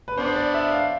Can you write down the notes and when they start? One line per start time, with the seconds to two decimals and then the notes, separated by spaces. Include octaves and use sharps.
0.08 B4
0.17 B3 D4 C5
0.28 C5
0.36 D5
0.54 E5
0.72 F5